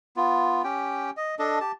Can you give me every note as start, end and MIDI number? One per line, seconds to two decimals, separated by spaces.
0.17 0.62 59
0.17 0.62 65
0.64 1.10 61
0.64 1.10 67
0.64 1.10 79
1.17 1.35 75
1.39 1.59 62
1.39 1.59 69
1.39 1.59 75
1.61 1.72 67
1.61 1.72 81